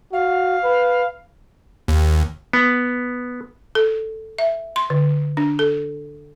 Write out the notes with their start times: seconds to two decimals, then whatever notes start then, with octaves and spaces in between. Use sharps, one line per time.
0.12 F#4 F5
0.64 B4
1.88 D#2
2.53 B3
3.75 A4
4.39 E5
4.76 C6
4.90 D3
5.37 D4
5.59 A4